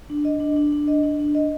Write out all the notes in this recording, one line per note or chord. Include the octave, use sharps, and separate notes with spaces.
D4
D#5
D4
D4
D4
D#5
D4
D4
D#5